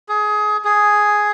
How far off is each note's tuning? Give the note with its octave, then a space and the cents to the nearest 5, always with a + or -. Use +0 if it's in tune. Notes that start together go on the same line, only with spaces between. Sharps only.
G#4 +20
G#4 +5